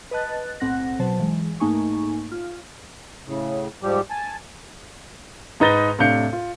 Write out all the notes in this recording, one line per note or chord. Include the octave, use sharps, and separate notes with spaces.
B4 D#5 A5 F#6 A6
B1 A2 C4 F#5 F#6 A#6
B2 F#3 C5 A5
E3 G#3
G#2 A3 A#3 D#4 G#5 C#6
F4
A2 C#3
G#2 F3 G3 G4
G#5 A5
G#2 D#4 B4 A6 A#6 G7
A2 C3 D4 F5 G6 C#7
F4